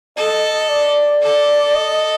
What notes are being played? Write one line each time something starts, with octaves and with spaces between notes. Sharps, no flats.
A4 D#5
D5
A4
D#5